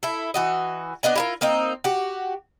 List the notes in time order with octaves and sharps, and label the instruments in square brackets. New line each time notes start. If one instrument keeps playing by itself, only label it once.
[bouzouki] E4 A4
E3 F#4 D#5
B3 D4 D#5 G#5
E4 F4 A#4
A#3 C4 D#4 D#5
F#4 G4